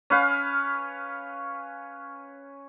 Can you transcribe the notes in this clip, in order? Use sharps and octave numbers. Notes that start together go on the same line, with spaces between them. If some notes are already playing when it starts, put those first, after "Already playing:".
C#4 B4 F5